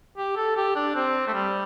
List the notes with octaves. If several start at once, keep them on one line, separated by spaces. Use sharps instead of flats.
G4
A4
G4
D4
C4
A3
G3